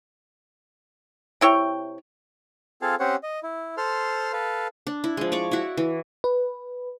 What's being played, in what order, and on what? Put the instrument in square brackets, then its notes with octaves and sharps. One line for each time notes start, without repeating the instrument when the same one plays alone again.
[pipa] C3 E4 C#5 G5
[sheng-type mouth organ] C4 F4 G#4 A4 F5
C4 C#4 G4 C5 C#5 F#5
D#5
E4
A4 C5 C6 F6
A4 B4 F5
[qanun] D4
E4
F3 G#3
C#5 D5 D6
E4 F#4
E3
[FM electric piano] B4